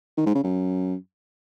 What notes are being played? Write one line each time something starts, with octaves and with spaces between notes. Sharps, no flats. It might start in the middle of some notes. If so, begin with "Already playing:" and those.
D#3
G#2
C#3
F#2